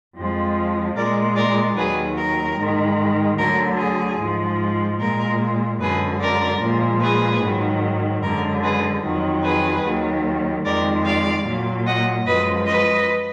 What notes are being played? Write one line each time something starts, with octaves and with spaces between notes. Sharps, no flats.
F2 F3 G#3
A#2 G#3 A#4 D5
A#4 D5
D#2 D#3 F#3 G#4 B4
A#4
G#2 D#3 G#3
D2 D3 F#3 A#4
G#4
G#2 F3 G#3
A#2 G#3 A#4
F#2 D3 G#3 G#4 B4
A#4 D5
A#2 F3 G#3
G#4 B4
G#2 D#3 F#3
F#2 D3 G#3 A#4
G#4 B4
F2 D#3 F#3
G#4 B4
D#2 D#3 F#3
F2 D#3 G#3 A#4 D5
D5 F5
A#2 F#3
D#5 F#5
F#2 F3 G#3 B4 D#5
B4 D#5